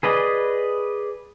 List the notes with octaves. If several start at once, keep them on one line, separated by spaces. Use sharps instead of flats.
G#4 B4 D5 D#5